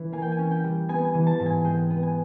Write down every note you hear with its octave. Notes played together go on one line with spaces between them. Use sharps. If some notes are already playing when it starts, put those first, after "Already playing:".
Already playing: E3 C#4
A#3 G#5
G5
G#5
C#4
G5
G3
B3 G#5
G#5
E3
A5
G#2
G#5
G#3 G5
B3
G#5